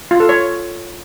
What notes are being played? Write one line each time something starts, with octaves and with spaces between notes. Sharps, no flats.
F4
A4
C#5